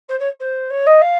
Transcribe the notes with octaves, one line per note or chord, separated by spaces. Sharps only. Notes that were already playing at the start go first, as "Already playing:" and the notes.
C5
C#5
C5
C#5
D#5
F5